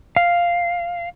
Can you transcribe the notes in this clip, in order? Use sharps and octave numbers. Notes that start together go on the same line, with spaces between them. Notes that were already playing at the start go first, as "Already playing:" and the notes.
F5